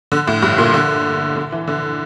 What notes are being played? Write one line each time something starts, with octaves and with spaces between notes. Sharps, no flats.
D3
A2
G2
A#2
D3
D3
E3
D3